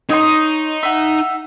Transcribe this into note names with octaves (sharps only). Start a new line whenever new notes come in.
D#4 C#5 D#5 C6
E5 F#5